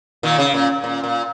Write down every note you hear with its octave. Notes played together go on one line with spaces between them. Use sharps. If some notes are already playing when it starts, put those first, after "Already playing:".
A#2 D#3
C#3
A#2
A#2
A#2